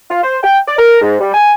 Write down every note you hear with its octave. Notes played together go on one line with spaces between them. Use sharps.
F4
C5
G5
D5
A#4
G#2
G3
G#5